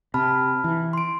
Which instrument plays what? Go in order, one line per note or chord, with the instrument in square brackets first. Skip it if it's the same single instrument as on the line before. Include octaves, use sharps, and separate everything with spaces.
[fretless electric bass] C3 [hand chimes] A5 B5 F6
[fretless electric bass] E3
[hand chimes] C6 D7